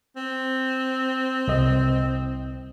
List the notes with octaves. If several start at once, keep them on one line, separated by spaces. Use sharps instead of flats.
C4
C2 D#5